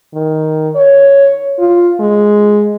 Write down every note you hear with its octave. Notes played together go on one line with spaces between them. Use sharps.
D#3
C#5
F4
G#3